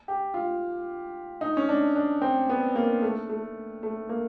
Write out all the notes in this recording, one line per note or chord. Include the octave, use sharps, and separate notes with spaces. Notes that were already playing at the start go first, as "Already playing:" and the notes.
G4
F4
D#4
C#4
D4
D4
C4
B3
A#3
A3
A3
A3
A#3